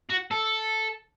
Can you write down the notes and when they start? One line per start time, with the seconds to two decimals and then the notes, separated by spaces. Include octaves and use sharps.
0.10 F#4
0.31 A4